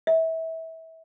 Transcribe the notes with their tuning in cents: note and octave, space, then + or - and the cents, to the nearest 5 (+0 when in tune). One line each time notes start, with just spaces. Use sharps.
E5 -25